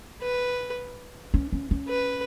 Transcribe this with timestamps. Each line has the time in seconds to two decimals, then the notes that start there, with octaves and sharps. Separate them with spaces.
0.22 B4
1.34 C#4
1.53 C#4
1.71 C#4
1.89 B4